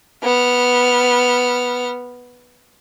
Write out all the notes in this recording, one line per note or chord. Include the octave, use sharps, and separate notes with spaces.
B3 F6